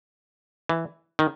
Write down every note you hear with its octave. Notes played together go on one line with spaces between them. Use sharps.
E3
D#3